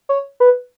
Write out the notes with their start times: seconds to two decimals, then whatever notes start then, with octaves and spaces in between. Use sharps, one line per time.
0.09 C#5
0.40 B4